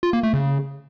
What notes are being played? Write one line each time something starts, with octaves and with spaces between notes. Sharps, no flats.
F4
A#3
A3
C#3